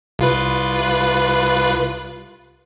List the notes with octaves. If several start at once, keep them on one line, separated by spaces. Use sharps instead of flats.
C2 F4 B4